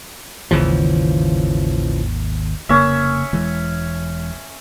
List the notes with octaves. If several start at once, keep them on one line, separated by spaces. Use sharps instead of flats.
G#1 D#2 C#3 E3 F3
F1 C#3 A#3 C#4 E5
E1 E3 G#3